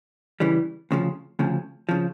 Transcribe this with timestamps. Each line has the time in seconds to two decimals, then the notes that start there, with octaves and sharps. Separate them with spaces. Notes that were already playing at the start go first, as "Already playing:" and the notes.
0.40 C#3 E3 G3
0.91 D2 C#3 F3
1.39 D2 C#3 F3
1.89 C#3 F3